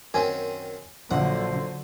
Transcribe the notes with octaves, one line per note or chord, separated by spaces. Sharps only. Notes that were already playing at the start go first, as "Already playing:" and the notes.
F#2 D#3 C4 G#5
A#1 D3 F#3 C5 F#5